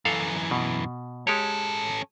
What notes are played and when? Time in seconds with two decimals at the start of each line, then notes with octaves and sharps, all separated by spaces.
0.05 F#2 E3 A4 F5
0.51 B2
1.27 G#3 C#4 G4 A4 C#5